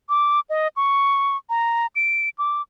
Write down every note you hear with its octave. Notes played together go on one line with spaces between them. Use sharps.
D6
D#5
C#6
A#5
D7
D6